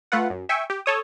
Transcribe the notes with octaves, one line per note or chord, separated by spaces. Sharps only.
A3 F4 B4 F#5
F#2
E5 G5 G#5 C#6
G4
A4 C#5 D#6